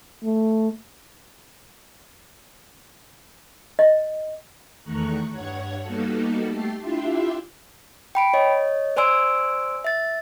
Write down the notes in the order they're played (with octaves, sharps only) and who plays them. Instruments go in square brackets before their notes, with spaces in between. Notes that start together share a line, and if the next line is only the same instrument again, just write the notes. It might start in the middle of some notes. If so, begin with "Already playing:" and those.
[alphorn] A3
[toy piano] D#5
[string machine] E2 D#3 A3 A#5 C#6 F#6
G2 C#5 F#5 G#6
G3 A#3 B3 D#4 F#4 A4
A3 G4 A5 C7
D4 E4 F4 G4 E5 C6
[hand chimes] G5 B5 D7
C#5 D#5
C5 D5 G#5 C6 E6 D7
E5 A6